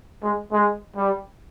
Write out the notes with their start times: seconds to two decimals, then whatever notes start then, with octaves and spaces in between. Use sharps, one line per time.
0.23 G#3
0.52 G#3
0.96 G3